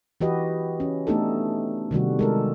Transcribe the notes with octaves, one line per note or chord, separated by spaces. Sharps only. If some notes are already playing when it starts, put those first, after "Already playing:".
E3 F#4 G4 B4 D#5
C#4
A3 B3 D4 D#4 G4 A4
C3 D#3 G3 F#4
G#3 A4 A#4